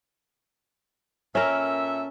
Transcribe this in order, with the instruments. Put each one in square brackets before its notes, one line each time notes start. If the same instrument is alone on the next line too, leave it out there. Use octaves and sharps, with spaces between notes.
[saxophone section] A#2 A4 E5 [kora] C#4 A#4